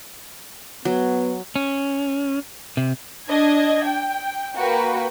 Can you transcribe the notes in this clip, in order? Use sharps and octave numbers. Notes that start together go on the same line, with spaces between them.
F#3 B3
C#4
C3
D4 D#5 G#6
G5
A#3 F#4 B4 G5